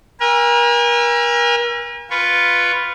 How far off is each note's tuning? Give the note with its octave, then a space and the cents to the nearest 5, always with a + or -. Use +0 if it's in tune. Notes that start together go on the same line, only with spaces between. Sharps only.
A#4 +35 G#5 -35 E6 +45
F4 +0 B4 +5 C#6 +0